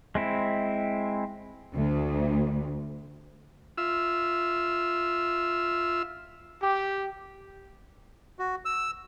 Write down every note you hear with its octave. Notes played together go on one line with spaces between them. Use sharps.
G#3 C4 E4
D2
F4 E5 E6
G4
F#4
E6